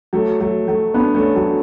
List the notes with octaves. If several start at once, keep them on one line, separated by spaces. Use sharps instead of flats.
F#3 A3
F#3 A3
F#3 A3
B3 D4
A3 C#4
F#3 A3